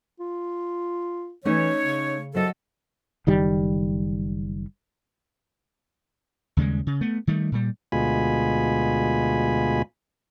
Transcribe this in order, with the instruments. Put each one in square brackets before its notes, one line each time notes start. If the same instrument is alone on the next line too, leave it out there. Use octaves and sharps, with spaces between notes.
[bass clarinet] F4
[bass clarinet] E3 [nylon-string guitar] A3 C#4 D#4 [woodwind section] C#5
[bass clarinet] C#3
[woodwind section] C2 A4 [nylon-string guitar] F#3 D#5
[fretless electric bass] F#1 D#3 G3
[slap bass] D#2 C#3 G3 G#3
C#3
A3 B3
D#3 G3 A3
A#2 G3
[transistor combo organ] D2 B2 G#3 F4 G#5 B5